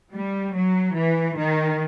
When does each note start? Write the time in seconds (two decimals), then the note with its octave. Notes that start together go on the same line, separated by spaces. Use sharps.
0.13 G3
0.54 F#3
0.95 E3
1.36 D#3